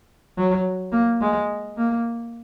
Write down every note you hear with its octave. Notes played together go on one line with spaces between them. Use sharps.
F#3
A#3
G#3
A#3